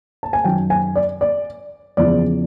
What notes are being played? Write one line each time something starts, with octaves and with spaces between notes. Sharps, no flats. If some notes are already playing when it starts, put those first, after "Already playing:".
A5
G#5
F#2 D#3 F#3 G5
G#5
D5
D5
E2 C#3 F3 D5